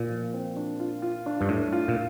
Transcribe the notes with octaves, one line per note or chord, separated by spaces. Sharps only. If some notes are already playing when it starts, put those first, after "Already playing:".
Already playing: A#2 F4
F3
C4
D4
F4
F4
D4
G2
A2 D4
F4
A#2